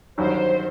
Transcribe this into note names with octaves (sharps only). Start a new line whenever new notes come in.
A1 G2 D#3 F#3 C5